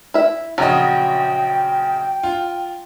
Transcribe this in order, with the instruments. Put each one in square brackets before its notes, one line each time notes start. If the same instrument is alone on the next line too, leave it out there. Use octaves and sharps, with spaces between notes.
[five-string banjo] E4 E5
[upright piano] A#1 C#3 D#5 [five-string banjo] F#3 [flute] G5
[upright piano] F4